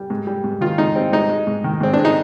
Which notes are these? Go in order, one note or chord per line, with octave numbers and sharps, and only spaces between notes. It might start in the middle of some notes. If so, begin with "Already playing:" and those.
Already playing: G3
G#2
G3
G#2
D#3 F4
G#2 D#4
G3 C4
G#2 D#4
G#3
G#2
D#3
G#2 C4
G#3 D4
D#4